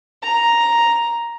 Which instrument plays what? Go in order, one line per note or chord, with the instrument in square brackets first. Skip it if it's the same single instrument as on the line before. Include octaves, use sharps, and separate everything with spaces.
[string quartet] A#5